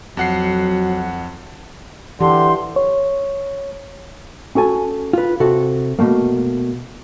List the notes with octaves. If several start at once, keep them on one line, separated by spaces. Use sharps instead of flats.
F2 F#3 F#5 C7
D3 E3 G4 C6
C#5
C#4 F#4 A4 G#5 A5
F4 B4
C3 F#4 A4
B2 F3 A3 A#3